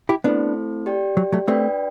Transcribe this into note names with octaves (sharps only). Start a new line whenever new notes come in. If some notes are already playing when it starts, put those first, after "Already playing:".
E4 G4
A3 B3 C4 D4 E4 A4 C5
G4 D5 G5
F#3
F#3 A3
A3 C4 D4 F#4 B4 D5 G5